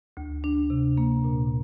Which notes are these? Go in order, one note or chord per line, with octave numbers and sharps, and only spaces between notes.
D2
D4
C3
A#3
A#2